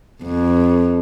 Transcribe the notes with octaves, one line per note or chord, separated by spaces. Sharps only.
F2